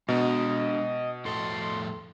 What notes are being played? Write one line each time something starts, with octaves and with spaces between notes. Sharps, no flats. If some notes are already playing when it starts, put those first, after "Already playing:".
B2 G#3 D4 D#5 A#5
F2 A2 A4 C6